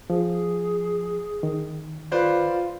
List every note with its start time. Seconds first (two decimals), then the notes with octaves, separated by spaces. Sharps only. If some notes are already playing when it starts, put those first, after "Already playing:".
0.10 F3 G#4
1.43 D#3
2.12 F4 B4 C5 D5